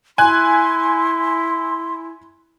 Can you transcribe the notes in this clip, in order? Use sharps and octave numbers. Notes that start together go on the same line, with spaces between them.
E4 G#5 C6 F#6